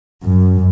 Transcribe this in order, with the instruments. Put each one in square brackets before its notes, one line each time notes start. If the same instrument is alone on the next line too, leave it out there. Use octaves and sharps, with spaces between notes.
[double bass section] F#2